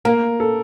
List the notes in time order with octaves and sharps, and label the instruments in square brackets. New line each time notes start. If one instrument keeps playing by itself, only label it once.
[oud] A#3 [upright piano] A#4
[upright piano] A4